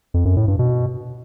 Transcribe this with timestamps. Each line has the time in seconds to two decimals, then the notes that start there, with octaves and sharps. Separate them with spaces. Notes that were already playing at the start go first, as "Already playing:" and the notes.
0.14 F2
0.25 F#2
0.37 A2
0.48 G2
0.59 B2